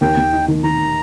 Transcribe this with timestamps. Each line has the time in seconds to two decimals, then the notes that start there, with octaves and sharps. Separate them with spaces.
0.01 D#2 G5
0.17 D#2
0.33 D#4
0.48 D#3
0.64 D#3 A#5